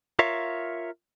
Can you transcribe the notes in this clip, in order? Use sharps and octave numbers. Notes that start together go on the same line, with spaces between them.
F4 A#4 C#5 E5 F5